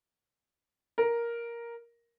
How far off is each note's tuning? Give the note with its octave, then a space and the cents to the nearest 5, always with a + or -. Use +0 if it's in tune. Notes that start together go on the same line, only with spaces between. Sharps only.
A#4 +5